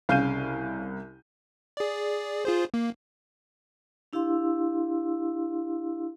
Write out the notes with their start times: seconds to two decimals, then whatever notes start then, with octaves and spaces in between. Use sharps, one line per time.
0.09 C2 C#3 F5 G6 D#7
1.77 G#4 D5
2.45 F4 G#4 C5
2.74 A#3
4.13 D4 E4 G4 F5 C6 E6